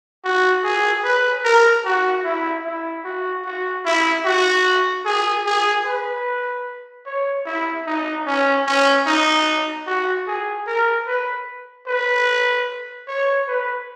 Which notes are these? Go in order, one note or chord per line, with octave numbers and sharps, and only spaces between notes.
F#4
G#4
B4
A#4
F#4
E4
E4
F#4
F#4
E4
F#4
G#4
G#4
B4
C#5
E4
D#4
C#4
C#4
D#4
F#4
G#4
A#4
B4
B4
C#5
B4